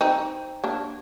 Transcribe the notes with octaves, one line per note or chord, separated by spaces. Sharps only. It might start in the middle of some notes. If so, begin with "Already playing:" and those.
C4 D#4
A#3 D4